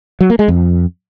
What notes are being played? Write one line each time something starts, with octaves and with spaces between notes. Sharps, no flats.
F#3
A#3
G#3
F2